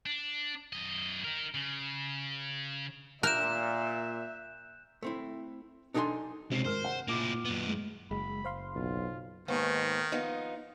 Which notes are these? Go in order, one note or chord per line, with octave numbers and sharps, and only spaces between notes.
D4
F#2 D#5
D#4 A#4
C#3
A#2 A#4 E5 F#6 G6 E7
A3 C4 E4
D4 D#4 A4 G5 G#5 C6
C3 G#3 C#4 C7
G#1 A#4 C5 F6
F#5
A#2 A#3 E4 D6 D#7
F#2 B3
G#3
F#1 G#3 B5
C5 F5 C6
B1 F4
D#2 G#2 D#3 B3
F3 B3 D#4